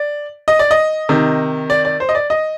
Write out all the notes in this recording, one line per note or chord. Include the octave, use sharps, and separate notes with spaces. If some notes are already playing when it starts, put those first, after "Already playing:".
Already playing: D5
D#5
D5
D#5
C3 D#3
D5
D5
C5
D#5
D5
D#5